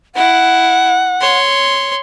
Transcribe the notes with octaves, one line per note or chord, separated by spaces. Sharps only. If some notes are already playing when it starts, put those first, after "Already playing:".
E4 F#5
C#5 C6